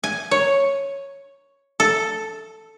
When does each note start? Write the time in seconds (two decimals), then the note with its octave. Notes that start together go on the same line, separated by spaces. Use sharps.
0.04 G#5
0.31 C#5
1.80 A4